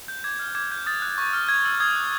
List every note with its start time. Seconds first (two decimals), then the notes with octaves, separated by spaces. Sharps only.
0.08 G6
0.24 D6 G#6
0.39 F6
0.55 D6 G#6
0.71 G6
0.86 D#6 A6
1.02 F#6
1.18 C#6
1.33 F6
1.49 G6 G#6
1.65 E6
1.80 D#6 G#6
1.96 F#6